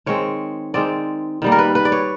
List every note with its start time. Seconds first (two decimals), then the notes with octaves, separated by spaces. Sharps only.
0.06 D#3 G#3 C4 C#5
0.74 D#3 G#3 C4 D5
1.42 D#3 G3 A#3
1.52 A#4
1.59 B4
1.75 B4
1.85 D5
1.92 C#5